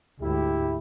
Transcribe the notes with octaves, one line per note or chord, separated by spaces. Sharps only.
D2 G#2 E4 G4